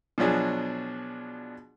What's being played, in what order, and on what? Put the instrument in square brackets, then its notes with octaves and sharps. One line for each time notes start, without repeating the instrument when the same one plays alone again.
[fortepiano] B2 F3 F#3 D4 G#4